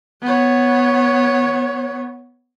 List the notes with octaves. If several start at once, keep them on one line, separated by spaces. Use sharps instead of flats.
B3 C#5